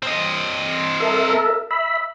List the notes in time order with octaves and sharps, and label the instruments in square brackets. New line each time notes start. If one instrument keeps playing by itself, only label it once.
[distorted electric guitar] C4 D#5
[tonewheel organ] A4 A#4 E5
E5 B5